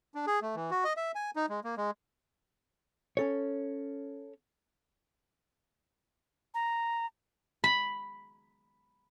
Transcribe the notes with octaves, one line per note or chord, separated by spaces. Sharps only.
D4
G#4
A3
E3
F#4
D#5
E5
G#5
D#4
G#3
A#3
G#3
C#4 A4 C#5
A#5
B5